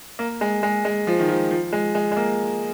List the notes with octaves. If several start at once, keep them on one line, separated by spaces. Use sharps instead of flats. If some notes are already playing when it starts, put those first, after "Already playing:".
A#3
G#3
G#3
G#3
F3
D#3
F3
F3
G#3
G#3
G#3
A#3